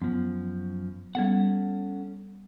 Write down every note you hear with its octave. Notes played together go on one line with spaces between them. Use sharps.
F#2 F3 B3
G3 B3 C#4 A4 F#5